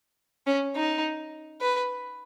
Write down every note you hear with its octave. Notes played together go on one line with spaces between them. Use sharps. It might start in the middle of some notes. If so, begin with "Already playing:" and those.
C#4
D#4
B4